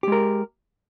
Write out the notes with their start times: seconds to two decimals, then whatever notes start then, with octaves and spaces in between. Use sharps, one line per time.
0.03 G4
0.08 G#3
0.12 A#4